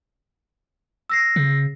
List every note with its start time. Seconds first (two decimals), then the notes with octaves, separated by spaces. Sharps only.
1.10 E6 A#6 C7
1.36 C#3